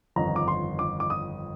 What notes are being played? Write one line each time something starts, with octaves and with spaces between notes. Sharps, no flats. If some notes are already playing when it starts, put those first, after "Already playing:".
G1 F2 D#3 A#5
D6
C6
D6
D6
D#6